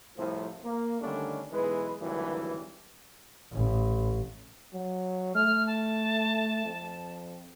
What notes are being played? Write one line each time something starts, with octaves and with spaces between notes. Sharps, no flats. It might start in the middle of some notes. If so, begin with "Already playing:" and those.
C2 A2 C3 F3
A#3
D3 D#3 G3 A3 C#4 D4
B1 E3 G#3 B4
G#1 D2 G2 D#3 E3 F#3
A1
F#3
A3 F6
A5
F2